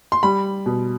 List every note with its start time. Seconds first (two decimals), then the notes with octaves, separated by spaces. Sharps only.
0.12 C6
0.23 G3 B5
0.66 B2